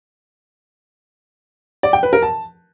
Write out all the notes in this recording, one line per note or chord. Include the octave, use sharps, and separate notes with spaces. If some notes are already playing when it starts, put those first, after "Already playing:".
D5
G5
B4
A#4
A5